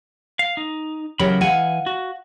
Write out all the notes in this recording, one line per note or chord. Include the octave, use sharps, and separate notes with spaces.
F5
D#4
C#3 E3 F#3 G4 A#4 B5
E3 F5 F#5 G#5
F#4